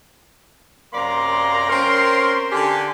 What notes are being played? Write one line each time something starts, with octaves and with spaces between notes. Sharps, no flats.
F#2 C3 A#3 D5 A#5 C6
C4 C#4 A#4 C#5 C6
D3 G4 G#5